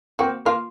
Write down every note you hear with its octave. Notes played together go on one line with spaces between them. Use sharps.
A#3 C4 F#4
A#3 F4